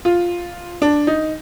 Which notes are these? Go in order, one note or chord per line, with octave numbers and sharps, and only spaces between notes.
F4
D4
D#4